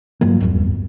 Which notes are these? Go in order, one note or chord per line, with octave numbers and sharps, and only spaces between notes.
G2 F3 F#3 A#3
D1 G1 E2 G2